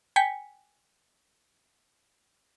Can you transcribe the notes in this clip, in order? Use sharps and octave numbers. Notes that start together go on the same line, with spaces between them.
G5 G#5 B6 C#7